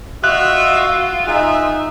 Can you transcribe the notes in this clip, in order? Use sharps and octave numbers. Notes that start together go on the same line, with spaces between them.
F4 F#4 D#5 E5 F#6
D#4 G#4 E5